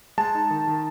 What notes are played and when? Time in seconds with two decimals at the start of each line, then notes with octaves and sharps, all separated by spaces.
0.18 G#3 A5
0.35 D#4
0.51 D#3
0.67 D#3